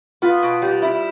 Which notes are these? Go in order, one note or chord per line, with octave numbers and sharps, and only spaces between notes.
B3 F4
B2
G3
E4